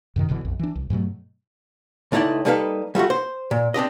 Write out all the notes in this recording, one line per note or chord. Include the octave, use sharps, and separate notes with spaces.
F#2 C3 D#3
E1 B2 D3 E3
B1 F2
E3 D4
C2
G2 B2 F#3 A3
C#2 A3 D#4 E4 D5 G5
G3 A#3 D#4 A4 B4 F5
G3 A3 F4 F#4
C5
A#2
C4 D4 G4 D#5